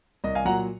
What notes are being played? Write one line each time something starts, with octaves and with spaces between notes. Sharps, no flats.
C2 D#5
F5 G#5
A#2 F#3 F#5 A#5